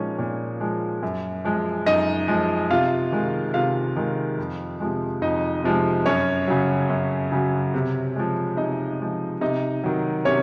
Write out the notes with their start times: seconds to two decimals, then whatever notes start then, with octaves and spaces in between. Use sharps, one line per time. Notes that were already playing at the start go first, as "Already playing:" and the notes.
Already playing: A#2 F3 G#3 C#4 D#4 C#5
0.19 A#2
0.61 F3 G#3
1.03 F#2
1.45 F3 G#3
1.86 F#2 D#4 D#5
2.28 F3 G#3
2.70 C3 F4 F5
3.12 D#3 G#3
3.54 C3 F4 F5
3.96 D#3 G#3
4.38 F2
4.80 C3 F3 G#3
5.22 F2 D#4 D#5
5.64 C3 F3 G#3
6.06 F#2 C#4 C#5
6.48 C#3 F#3
6.90 F#2
7.32 C#3 F#3
7.74 C3
8.16 F3 G#3
8.57 C3 D#4 D#5
9.00 F3 G#3
9.41 C3 D#4 D#5
9.84 D#3 F#3
10.25 C3 C#4 C#5